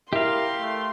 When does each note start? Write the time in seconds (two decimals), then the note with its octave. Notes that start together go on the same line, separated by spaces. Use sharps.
0.13 E4 G4 A#4 F5 C6
0.57 A3